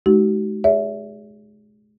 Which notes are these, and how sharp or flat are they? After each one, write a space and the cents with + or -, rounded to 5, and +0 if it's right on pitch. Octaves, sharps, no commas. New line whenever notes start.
G#3 +35 D#4 +0 F#4 +40
G#4 -10 C#5 +45 E5 +0